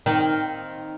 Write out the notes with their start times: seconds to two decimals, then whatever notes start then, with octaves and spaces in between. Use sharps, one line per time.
0.06 D#3 A#3 C4